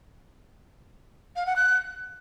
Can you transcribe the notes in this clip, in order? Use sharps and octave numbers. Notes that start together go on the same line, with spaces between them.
F5
F#5
F#6